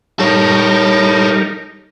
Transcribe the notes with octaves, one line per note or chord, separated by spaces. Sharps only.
G3 D#4 A4 A#4 C#5